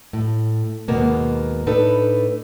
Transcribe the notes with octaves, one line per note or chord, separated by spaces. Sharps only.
A2
D#2 G#2 B2 A#3 B3
A2 D4 D#4 A4 B4